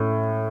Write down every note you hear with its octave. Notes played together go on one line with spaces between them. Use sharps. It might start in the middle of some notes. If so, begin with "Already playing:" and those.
Already playing: A2 C#4